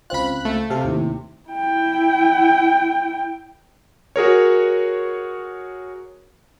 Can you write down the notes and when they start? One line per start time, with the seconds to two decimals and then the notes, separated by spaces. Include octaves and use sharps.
0.10 C#2 C4 F4 B5 F#6
0.45 A3
0.70 C3 A4 F5
0.84 D#2 A2
1.49 E4 G5
4.16 F#4 G#4 A#4 C#5